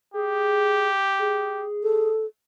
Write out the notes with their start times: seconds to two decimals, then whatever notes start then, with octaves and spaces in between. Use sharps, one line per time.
0.14 G4 G#4
1.19 G#4
1.83 A4